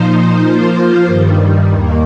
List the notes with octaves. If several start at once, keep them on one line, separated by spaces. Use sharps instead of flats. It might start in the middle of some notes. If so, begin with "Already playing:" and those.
Already playing: A#2 F3 D#4 C5
F3 A#3 F4 C5
G2 D#3 G3
D#2 D#3 A#3